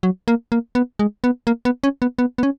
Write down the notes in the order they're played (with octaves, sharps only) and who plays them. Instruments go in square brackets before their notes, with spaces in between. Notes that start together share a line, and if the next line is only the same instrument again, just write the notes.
[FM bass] F#3
A#3
A#3
B3
G#3
B3
A#3
B3
C#4
B3
B3
B3
C#4